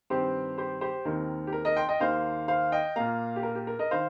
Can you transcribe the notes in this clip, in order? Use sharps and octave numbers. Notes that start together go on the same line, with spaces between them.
G2 D#3 C4 G4 C5
G4 C5
G4 C5
D#2 D#3 C4 A#4
G4
A#4
A#4 D#5
G5 C6
D#5 G5
D#2 D#3 A#3 C5 F5
C5 F5
D#5 G5
A#2 A#3 F5 A#5
G4
A#4
G4
A#4
A#4 D#5
D#3 C5 F5